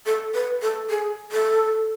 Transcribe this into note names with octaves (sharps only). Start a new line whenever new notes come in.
A4
B4
A4
G#4
A4